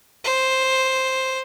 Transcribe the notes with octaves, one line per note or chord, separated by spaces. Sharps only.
C5